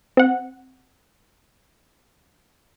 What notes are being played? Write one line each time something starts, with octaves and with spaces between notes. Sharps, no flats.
C4 F#5